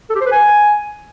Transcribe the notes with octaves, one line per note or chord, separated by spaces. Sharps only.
A4
G4
C5
B4
G#5